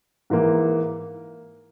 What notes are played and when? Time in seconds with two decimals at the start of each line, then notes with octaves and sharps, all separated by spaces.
0.30 G#2 E3 A#3